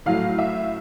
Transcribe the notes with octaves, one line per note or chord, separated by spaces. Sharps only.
A2 F#3 A3 F5
E5